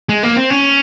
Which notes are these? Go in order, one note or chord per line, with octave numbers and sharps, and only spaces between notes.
G#3
A#3
C4
C#4